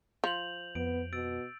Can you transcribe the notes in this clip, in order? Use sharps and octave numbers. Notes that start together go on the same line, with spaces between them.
F3 G6 F7 F#7
F2 B3 D7
B2 E6 A6 D7